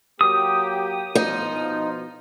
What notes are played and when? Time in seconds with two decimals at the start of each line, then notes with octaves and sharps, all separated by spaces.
0.21 F#3 A#3 G4 D#6
1.15 B2 F3 D#4